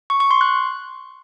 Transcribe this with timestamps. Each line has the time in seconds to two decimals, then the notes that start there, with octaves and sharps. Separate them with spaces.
0.10 C#6
0.20 C#6
0.31 C6
0.41 F#6